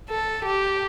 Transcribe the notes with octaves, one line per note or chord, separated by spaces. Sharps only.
A4
G4